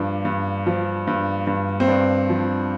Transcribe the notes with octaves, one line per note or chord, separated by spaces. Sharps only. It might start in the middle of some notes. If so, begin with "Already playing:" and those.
Already playing: G2 F3 D4
G2
F3
G2
G2
C4
G2 D4
F3